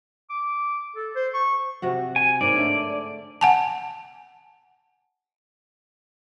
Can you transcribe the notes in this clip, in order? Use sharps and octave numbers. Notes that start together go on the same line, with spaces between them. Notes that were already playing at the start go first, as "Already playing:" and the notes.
D6
A4
C5
C#6
C3 F#4 F#5
G#5
G#2 A#3 C#5 D5
D3 A3
F#5 G#5 A5